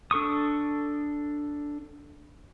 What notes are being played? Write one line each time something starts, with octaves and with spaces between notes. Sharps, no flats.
D4 A4 C#6 D#6